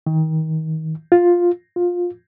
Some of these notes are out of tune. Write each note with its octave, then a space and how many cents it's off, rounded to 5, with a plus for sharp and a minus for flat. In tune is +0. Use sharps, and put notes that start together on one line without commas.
D#3 +30
F4 +5
F4 +15